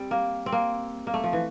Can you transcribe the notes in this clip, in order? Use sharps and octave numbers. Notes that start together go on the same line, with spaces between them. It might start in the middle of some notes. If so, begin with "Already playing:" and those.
Already playing: G3 C4
A#3
C4
A#3
A#3
A3
F3
E3